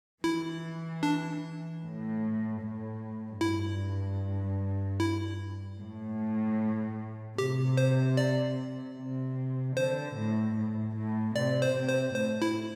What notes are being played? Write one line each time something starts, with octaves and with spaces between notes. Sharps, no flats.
E3 E4
D4
A2
A2
G2 E4
E4
A2
C3 G4
C5
D5
C3
D3 C5
A2
A2
A2
C3 D5
C5
C3
C5
A2 C5
E4